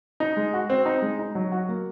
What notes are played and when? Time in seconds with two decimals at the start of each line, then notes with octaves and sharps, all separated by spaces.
0.20 D#4
0.37 G#3
0.54 F#4
0.70 C4
0.86 D#4
1.02 G#3
1.19 D#4
1.35 F#3
1.52 F#4
1.69 A#3